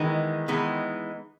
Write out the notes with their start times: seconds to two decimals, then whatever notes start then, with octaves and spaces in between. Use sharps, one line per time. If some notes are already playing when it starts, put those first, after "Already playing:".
Already playing: D#3 E3 G#3 B3 D#4
0.48 E3 G#3 B3 D#4